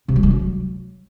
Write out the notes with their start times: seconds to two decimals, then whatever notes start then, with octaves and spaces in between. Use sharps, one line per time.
0.08 C3
0.16 F#3
0.23 G#3
0.30 F#3